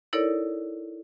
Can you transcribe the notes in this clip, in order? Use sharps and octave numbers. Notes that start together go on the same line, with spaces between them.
D#4 E4 A4 A#4 C#5 D5